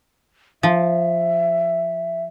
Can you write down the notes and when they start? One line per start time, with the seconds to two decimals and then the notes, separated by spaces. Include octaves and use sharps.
0.63 F3 E5